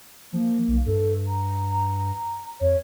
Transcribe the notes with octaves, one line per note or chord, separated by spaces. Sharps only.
F3 A#3
B1
G2 A4
A#5
F2 C#5